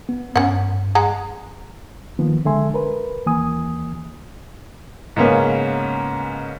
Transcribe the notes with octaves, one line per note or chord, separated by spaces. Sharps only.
B3
G2 C#4 F#5
G#3 F#5 A#5
D#3 F3 A#3 B3
D3 G#3 A4 E5 G#5 C6
A#4 B4
D#2 E3 A#3 G#5 D#6
G#2 C#3 A#3 B3 C#4